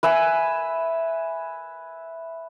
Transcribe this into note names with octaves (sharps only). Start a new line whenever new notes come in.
B4 E5 G#5